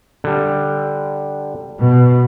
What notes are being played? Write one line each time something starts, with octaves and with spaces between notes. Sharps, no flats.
D3 G3
B2